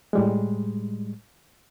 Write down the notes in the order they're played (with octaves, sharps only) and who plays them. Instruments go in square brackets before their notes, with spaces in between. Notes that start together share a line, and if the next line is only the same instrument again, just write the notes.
[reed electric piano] A2 G3 G#3